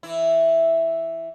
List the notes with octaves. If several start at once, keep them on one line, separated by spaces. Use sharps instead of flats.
E3 E4